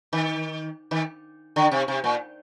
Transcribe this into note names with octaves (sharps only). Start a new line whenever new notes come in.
D#3
D#3
D3
C3
C3
A#2